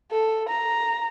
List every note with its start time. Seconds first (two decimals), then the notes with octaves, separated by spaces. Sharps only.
0.11 A4
0.49 A#5